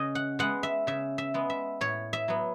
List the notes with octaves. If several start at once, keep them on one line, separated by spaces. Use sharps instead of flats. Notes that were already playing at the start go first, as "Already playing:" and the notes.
Already playing: C#3 D#5
F#5
G#3 B3 F#5
E5
C#3 E5
E5
G#3 B3
E5
A2 C#5
E5
F#3 B3